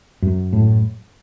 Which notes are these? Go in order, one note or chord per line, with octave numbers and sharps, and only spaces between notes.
F#2
A2